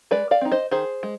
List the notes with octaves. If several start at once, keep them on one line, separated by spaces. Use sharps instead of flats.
G#3 B4 D5
D5 F5
C4 D#4
C5 D#5
D#3 G#4 C5
G#3